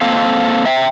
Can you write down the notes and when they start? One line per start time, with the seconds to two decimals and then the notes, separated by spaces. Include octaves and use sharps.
0.01 A#3 C4 A4 F5
0.66 E5 G5